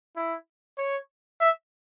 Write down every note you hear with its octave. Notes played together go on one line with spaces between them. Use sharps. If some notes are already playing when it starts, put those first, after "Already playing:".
E4
C#5
E5